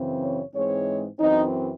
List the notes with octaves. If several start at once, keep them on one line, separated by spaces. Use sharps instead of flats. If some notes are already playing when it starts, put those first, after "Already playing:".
Already playing: F#2 C#3 E3 C4
C#5
G#2 E3 G#3 C4 C#5
F#2 E3 C4 D#4